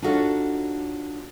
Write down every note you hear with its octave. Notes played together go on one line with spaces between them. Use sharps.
D4 D#4 F4 F#4 A4 C#5